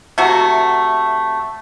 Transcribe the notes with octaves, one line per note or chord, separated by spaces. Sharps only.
C3 A3 F#4